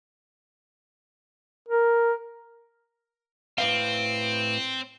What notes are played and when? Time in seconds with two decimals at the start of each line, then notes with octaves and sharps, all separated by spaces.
1.68 A#4
3.58 A2 C4 B4 F5